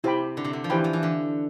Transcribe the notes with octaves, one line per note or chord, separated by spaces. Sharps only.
C3 E4 G4 C5 G5 B5
D3
C3
D3
F3
E3 E4 G4 C5 G5 B5
F3
E3
D3